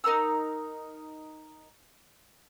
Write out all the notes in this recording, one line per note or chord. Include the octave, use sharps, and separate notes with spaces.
D#4 A#4 A#5 E6